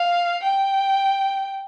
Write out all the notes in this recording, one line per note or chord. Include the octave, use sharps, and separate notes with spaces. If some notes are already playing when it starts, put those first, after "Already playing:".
Already playing: F5
G5